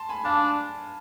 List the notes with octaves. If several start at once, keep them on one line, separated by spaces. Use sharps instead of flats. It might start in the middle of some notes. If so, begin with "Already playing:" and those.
Already playing: A5 C6
G#5 B5
D4 F5 A5